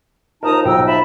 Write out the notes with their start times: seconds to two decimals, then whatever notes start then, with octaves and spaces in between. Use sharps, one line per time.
0.43 D#2 F3 D#4 A#4 A5 A#5 D#6
0.65 B1 G5 E6
0.86 E5 A5 B5